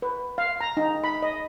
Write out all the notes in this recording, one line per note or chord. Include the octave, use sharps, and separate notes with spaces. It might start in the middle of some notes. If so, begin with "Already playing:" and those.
B4
F5
A#5
D#4
B5
D#5